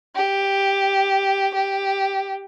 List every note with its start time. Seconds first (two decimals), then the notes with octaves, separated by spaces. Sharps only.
0.15 G4
1.55 G4